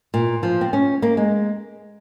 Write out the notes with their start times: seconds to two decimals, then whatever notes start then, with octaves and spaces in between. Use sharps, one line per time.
0.14 A#2
0.43 F3
0.61 C4
0.73 C#4
1.02 A#3
1.17 G#3